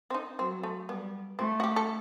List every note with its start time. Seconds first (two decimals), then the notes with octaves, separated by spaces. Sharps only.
0.10 C4
0.14 D#4
0.39 F#3 C4
0.63 A3
0.89 G3 B3
1.39 A3 C4
1.60 F#4
1.64 G4
1.76 A4